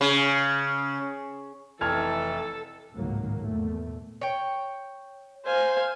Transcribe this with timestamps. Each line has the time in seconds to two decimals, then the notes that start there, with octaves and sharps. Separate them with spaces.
0.01 C#3
1.81 F1 E3 A4 A5 F6 G#6
2.93 G#1 C#2 A2 D#3 F#3 A#3
3.41 E2 A#2 A3
4.21 C#5 G5
5.46 C5 F5 G#5